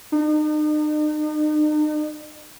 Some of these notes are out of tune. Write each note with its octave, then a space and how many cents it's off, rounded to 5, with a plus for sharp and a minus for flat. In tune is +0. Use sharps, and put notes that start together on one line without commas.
D#4 -40